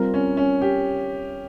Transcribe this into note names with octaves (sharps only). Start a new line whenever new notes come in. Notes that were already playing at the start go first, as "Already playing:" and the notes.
Already playing: G3 C4 F4 A#4
C#4
C#4
G4